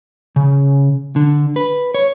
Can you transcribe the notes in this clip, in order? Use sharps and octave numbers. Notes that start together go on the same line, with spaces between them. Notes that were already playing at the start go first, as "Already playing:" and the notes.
C#3
D3
B4
C#5